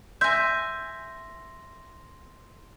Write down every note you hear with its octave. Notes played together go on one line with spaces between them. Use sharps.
E5 G#5 C6 G6 A#6